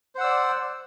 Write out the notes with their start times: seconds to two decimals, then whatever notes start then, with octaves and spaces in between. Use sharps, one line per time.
0.15 C5
0.18 F#5
0.21 E6
0.24 D5